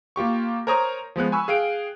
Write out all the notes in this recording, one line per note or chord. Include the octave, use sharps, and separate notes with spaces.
A#3 F4 G4 C#6
A#4 C5 C#5 A#5 C#6 D#6
F3 G#3 B3 F#6
G#5 B5 C#6 E6
G#4 F5 G5 D7